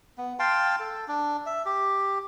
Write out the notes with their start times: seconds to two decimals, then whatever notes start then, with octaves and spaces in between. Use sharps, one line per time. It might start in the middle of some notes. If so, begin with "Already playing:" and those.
0.18 B3
0.39 F5 G5 A5 C6
0.79 A4
1.08 D4
1.46 E5
1.66 G4